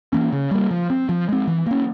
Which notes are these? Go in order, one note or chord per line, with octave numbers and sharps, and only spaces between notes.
E3 A#3 C#4
C#3
G3 A#3
F3
C4
F3
G#3 C4
E3
A#3 C#4